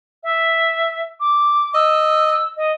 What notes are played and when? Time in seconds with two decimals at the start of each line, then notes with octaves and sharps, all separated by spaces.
0.23 E5
1.20 D6
1.74 D#5 E6
2.57 D#5